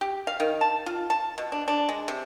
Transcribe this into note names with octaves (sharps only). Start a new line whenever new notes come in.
G4
F5
D#3
A5
F4
A5
B2
D4
D4
G#3
C3